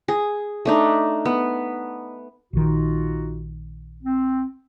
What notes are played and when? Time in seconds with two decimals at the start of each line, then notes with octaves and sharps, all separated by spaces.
0.08 G#4
0.65 A3 D4 D#4
1.25 B3
2.53 A#1 D#3 D#4 F4 F#4
4.03 C4